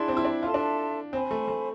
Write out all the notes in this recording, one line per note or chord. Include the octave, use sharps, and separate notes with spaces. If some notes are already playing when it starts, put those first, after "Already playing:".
Already playing: D4 E4 G#4 D5 A5 C6
C4
E4
D4
F4 A4 E5 A5 C6
D4
C4 C5 G#5 B5
A3
A3